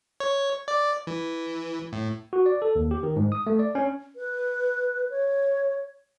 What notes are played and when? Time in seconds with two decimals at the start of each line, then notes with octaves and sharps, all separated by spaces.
0.20 C#5
0.68 D5
1.07 E3
1.93 A2
2.33 F#4
2.46 D5
2.62 A4
2.75 D#2
2.91 G4
3.03 D#3
3.16 G#2
3.32 D#6
3.47 A3
3.59 D5
3.75 C#4
4.16 B4
5.10 C#5